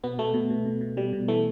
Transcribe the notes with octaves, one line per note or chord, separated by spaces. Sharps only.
B2 B3
B2 A3
B2
B2
B2
B2
B2 G3
B2
E3 A3